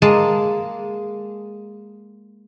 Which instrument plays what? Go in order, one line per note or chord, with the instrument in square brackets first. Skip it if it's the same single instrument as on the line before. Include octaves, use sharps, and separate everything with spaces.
[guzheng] G#3 A#3 A5